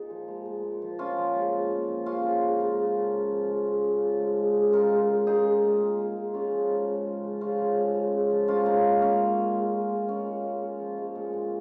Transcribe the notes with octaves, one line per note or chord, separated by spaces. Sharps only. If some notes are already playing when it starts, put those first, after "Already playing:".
Already playing: A#2 D#4 G#4
F3
G#3
A#2
A#2
F3
A#2 C#4 F4
F3
G#3
A#2
A#2
F3
C#3 C#4 F4
F3
G#3
C#3 F4 A#4
C#3
F3
C#3
F3
G#3
C#3
C#3
F3
G#3
G#3
C#3
C#3 F4 A#4
G#3
G#3
G#3 D#4 G#4
G#3
A#2
A#2
G#3
G#3
C#3 C#4 F4
F3
G#3
C#3
C#3
F3
C#3 C#4 F4
F3
G#3
C#3
C#3
F3
G#3 C#4 F4
G#3 A#3 D#4
A#2
A#2 C#4
G#3
G#3
G#3
G#3
A#2
A#2 C#4
G#3
G#3
A#2
F3
G#3
A#2
A#2